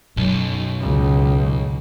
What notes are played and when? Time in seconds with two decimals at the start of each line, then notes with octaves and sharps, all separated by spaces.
0.17 B1 F#2
0.81 C#2